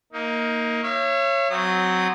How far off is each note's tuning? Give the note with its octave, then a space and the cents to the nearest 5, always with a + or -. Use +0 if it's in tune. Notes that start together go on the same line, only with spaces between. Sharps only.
A#3 +0 D#4 +20
C#5 -15 E5 +45
F#3 +0 C4 -10 D#6 -30